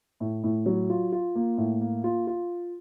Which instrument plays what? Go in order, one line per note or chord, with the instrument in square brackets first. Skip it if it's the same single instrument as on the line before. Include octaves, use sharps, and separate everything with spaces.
[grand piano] A2
A2
F#3
F4
F4
A#3
A2
A#3
F4
F4